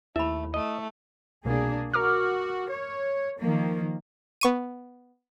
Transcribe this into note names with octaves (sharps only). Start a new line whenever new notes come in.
D#2 A3 E4 E5 B5
A3 D#5
C2 B2 A#3 D4 G#4
F#4 A#4 D6 F6
C#5
D#3 F3 A#3
B3 C#6 D#7